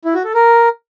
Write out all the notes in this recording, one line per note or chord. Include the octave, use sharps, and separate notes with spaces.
E4
F#4
A4
A#4